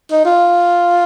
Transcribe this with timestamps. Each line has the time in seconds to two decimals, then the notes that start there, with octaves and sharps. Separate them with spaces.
0.12 D#4
0.25 F4